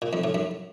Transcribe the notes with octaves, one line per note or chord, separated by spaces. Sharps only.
A#2
F2
A2
F#2